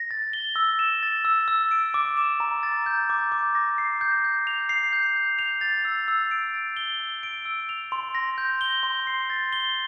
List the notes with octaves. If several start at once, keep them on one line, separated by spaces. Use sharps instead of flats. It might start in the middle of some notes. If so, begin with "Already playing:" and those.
Already playing: A#6
A6
G7
E6
E7
A6
E6
E6
D7
D6
E7
A#5
A6
G6
D6
D6
A#6
C7
G6
G6
F7
C7
G6
G6
F7
A6
E6
E6
D7
A6
G7
E6
D7
E6
F7
C6
A#6
G6
G7
C6
C7
A6
G7